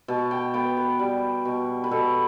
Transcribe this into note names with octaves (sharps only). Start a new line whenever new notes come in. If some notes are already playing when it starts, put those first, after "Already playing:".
B2 A5
G5
B3 G5
B4
G3
B2
B4
B2 A4